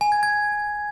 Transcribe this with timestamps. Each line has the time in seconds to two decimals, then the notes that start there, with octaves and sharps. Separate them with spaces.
0.01 G#5
0.12 G#6
0.23 G#6